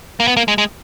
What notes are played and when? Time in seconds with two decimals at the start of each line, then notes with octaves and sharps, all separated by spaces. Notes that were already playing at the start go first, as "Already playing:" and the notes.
0.20 A#3
0.27 B3
0.37 A#3
0.48 G#3
0.58 G#3